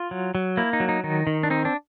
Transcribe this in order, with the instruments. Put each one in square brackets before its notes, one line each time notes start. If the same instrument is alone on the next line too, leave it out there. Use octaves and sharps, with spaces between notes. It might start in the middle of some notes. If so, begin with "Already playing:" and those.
Already playing: [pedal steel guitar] F4
F#3
F#3
A#3 E4
D#4
F#3
D#4
D#3 D#4
D#3
D4
C4 D#4
D4